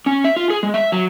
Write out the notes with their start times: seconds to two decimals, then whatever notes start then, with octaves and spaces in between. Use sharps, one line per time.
0.06 C#4
0.24 E5
0.36 F4
0.50 G#4
0.63 G#3
0.74 E5
0.92 F#3